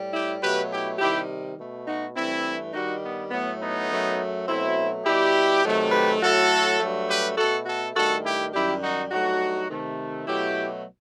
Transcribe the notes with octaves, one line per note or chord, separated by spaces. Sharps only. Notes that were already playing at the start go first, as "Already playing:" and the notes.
Already playing: A2 G3
E4 G4
B2 F#3 A3 G4 B4
E4 G4
C3 D#3 G3 E4 G4
B2 A3
D#4 F#4
G2 E3 A3 C4 E4
G2 D#3 G3 D#4 F#4
B3
A2 F#3 A3 B3
B3 D#4
F#2 F#3 A3
B2 F#3 A3 C4 E4
B2 G3 E4 G4
C3 D#3 F#3 A3
G4 B4
A2 F#3 A3 F#4 A4
G2 F#3 A3
G4 B4
B2 A3 F#4 A4
F#4 A4
G2 D#3 A3 F#4 A4
E4 G4
F#2 D#3 G3 E4 G4
D#4 F#4
G2 F#3 A3 D#4 F#4
C3 D#3 A3
B2 F#3 A3 E4 G4